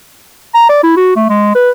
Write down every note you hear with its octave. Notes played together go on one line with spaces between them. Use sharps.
A#5
D5
E4
F#4
A3
G#3
B4